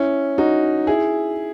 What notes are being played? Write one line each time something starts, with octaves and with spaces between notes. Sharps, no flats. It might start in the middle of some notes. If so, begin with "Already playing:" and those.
Already playing: C#4 E4
D#4 F#4
E4 G#4